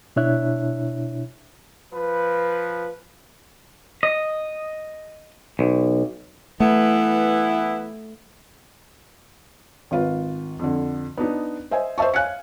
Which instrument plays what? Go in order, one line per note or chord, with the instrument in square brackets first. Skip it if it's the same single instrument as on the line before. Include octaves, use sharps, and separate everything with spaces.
[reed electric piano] B2 D4 E4 C#5 E5 F#6
[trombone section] F3 B4
[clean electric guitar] D#5
B1
[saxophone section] E3 B3 E4 [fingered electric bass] A3
[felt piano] G#1 F4 B4
F2 D3
B3 D4 D#4
C5 D#5 E5 G#5
C5 D#5 E5 A5 C#6
F5 G#5 F#6 G#6 C#7